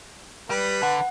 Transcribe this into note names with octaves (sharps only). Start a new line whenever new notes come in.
G3 B4
D3 F#5